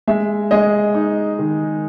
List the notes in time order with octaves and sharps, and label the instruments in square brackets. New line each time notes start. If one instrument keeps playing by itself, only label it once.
[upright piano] G#3 [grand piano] E5
[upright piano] G#3 [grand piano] D#5
[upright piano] D#4
D#3